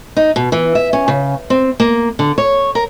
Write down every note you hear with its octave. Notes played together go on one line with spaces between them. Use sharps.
D#4
B2
E3
E5
C#4
C#3
C4
A#3
D3
C#5
A#4